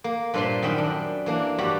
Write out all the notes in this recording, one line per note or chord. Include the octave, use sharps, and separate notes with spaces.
A#3
G2 A#2 G3 C5 E5 C6
F#2 D#3 D#5 E5 G5 B5
D4
E3 A#3 D4
G2 F#4 G4 D5 A#5 B5